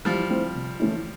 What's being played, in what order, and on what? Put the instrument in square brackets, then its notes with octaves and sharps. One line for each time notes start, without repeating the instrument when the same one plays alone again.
[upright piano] E3 [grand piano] F3 G3
[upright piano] A3 C4 E4
C3
E3 A3 C#4 E4